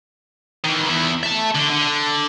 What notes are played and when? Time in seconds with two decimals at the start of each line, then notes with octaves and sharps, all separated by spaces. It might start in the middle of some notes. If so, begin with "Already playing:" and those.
0.65 D#3 E3
0.89 E2 E4
1.23 E5 A5
1.55 D3
1.70 D3